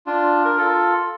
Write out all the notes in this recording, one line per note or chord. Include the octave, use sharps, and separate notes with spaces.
D4 F4
A#4
F4 A4